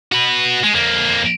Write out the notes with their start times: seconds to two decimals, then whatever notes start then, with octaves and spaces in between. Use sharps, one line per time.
0.12 F#4 B4
0.64 G#3
0.75 F2 A#3